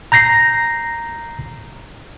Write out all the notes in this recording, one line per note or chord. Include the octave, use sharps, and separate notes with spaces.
A#5 G6 A#6 C7